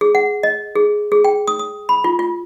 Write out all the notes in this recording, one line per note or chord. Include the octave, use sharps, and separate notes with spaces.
G#4
F#5
D#5
G#4
G#4
G5
D#6
D#6
B5
F4
F4